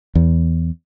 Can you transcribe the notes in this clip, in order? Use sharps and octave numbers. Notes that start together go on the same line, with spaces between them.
E2